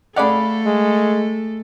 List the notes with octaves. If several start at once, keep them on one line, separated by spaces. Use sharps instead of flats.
A3 G#4 A4 D5 F5 F#5 B5
G#3